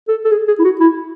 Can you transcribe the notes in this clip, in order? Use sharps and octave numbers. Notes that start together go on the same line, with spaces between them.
A4
A4
G#4
G#4
E4
F#4
E4